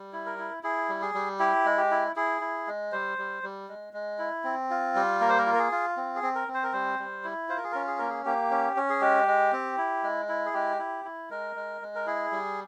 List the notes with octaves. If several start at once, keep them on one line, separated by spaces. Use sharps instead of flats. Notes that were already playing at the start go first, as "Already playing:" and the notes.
Already playing: G3
E4
A#4
E4
E4 G#4
G3
G#4
G3
E4 G4
G#3
G4
E4
E4 G#4
E4
G#3
G3 C5
G3
G3
G#3
G#3
E4
C4
F4
G3
A#3 A#4
C5
A#4
F4
A#4
G#4
F4
C4
G#4
C4
A#4
C4
C5
A#4
G3 C5
G3
E4
F4 C5
A#4
G#4
C#4 A#4
G#4
A#3 A#4
G#4
A#3 G4
C#4
C#4
G#4
G#3 G4
G#3
C4
E4
G#3
E4
G#4
G#3 G4
E4
E4
G#3 A#4
G#3
G#3
A#4
E4 G#4
G3